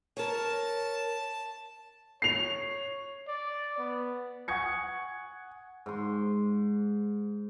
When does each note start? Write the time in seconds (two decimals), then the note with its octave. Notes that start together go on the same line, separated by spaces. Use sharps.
0.17 A#4 C#5 A5
2.22 C#5 C7 F7
3.27 D5
3.78 B3
4.48 F#5 G#5 C#6 D#6 G#6 C#7
5.86 G#2 C6